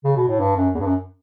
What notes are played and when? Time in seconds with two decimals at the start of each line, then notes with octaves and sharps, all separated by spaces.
0.04 C#3
0.16 B2
0.28 A2
0.39 G2
0.56 F#2
0.74 E2
0.80 G2
0.86 F#2